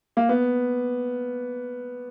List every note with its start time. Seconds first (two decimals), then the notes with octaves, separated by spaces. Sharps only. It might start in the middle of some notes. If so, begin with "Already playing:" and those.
0.17 A#3
0.29 B3